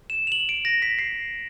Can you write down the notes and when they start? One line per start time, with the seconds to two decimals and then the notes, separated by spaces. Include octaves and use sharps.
0.10 E7
0.27 F7
0.32 F#7
0.49 D7
0.65 A#6
0.82 B6
0.99 C7